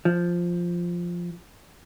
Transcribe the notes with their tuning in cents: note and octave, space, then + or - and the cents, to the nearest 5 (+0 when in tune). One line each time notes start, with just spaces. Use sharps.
F3 +0